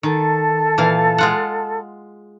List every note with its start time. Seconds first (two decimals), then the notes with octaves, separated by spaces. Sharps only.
0.03 D#3 A4 A5
0.78 A#2 E3 F5
1.18 G#3 F4 F#5